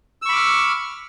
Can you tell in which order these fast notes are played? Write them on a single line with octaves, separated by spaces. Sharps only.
E6 C#6 B5 D6 F6